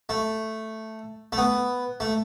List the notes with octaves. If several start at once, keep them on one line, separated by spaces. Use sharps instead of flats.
A3
A3
B3
A3